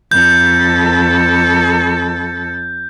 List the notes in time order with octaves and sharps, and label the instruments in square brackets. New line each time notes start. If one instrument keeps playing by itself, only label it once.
[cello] F2 A4 [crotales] G6